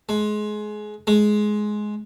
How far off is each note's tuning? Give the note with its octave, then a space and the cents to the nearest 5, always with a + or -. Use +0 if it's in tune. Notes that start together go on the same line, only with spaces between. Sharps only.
G#3 +25
G#3 +15